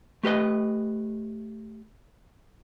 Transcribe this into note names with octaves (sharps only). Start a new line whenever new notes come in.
A3 G4 B4 D#5